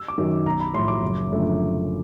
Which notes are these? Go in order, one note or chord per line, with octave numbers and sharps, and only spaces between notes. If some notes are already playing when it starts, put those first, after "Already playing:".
Already playing: E6
D6
F#2 D#3 F#3
B1 A#5
B5
A2 F3 C6
D6
F#1
F#2 D3 F3 A3